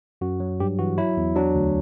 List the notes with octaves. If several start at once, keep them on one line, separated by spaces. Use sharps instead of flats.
F#2 F#4
F#3
G2 G4
E3 F#4
F#3 E4
E2
F#3 D4
D2